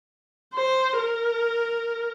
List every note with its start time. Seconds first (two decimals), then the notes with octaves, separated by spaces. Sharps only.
0.55 C5
0.98 A#4